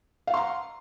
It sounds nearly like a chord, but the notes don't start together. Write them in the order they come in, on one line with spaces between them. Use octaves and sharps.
F5 F#5 C6 A#5